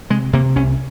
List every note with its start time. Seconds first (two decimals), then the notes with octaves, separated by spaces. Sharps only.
0.10 C3 G#3
0.33 C3 A#3
0.56 C2 C#4